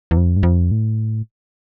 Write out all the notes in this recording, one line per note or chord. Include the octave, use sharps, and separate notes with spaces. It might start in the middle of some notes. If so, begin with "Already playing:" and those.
E2
F2
G2
F2
A2